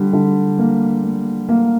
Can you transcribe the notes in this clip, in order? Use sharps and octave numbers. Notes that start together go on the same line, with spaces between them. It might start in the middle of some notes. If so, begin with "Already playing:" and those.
Already playing: D3 G3
D3
A#3
A#3
A#3